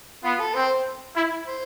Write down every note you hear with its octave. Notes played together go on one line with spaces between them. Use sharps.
B3 F4
A4
C4 C5
E4
C5